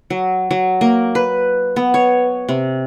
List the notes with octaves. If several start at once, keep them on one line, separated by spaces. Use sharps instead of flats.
F#3
F#3
A#3
B4
B3
C#5
C3